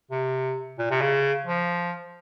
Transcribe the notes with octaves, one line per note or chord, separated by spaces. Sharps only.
C3
A#2
C3
C#3
F3